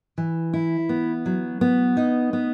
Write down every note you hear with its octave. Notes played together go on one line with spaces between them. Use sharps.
E3
E4
B3
F#3
B3
D#4
B3